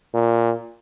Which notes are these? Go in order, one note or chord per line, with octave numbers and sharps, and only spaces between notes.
A#2